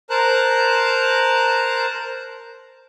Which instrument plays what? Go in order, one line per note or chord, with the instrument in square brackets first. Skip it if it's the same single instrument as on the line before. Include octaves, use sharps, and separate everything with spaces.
[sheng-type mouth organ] A#4 C5 A5 A#5 F#6